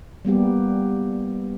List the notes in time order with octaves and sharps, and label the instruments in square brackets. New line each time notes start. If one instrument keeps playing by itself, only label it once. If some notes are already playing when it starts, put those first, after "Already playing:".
[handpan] G3 A#3 B3 G4